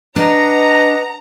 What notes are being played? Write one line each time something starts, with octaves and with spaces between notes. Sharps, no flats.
D4 B4 D#5 F#5 A#5